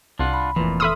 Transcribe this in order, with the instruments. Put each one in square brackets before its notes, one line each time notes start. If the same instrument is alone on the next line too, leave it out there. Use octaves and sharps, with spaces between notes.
[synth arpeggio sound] C2 [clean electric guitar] D4 F4 F#5
[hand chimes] B5
[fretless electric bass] F1 E3 [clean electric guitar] F2 A#2
[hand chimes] A4 C6 F6 [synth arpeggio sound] E5 B5 D#6